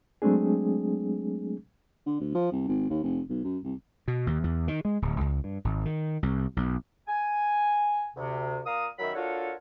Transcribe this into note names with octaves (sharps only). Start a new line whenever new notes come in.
F#3 G#3 A3 C4 D4 G#4
D3
D2
F3
C2
G#1
D#2
F1
B1
F#2
C2
B2
D#2
E2
D#3
G#3
D1
C#2
G2
G#1
D#3
C2
B1
G#5
D2 C3
A#2 F5 A#5 D#6
F#2 D#3 F#3 A#4 E5 B5
D4 F4 F#4 A4 A#4 C#5